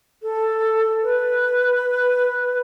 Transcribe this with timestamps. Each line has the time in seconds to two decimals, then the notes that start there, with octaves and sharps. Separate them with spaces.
0.23 A4
1.03 B4